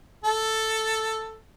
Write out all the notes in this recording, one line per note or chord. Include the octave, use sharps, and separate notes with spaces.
A4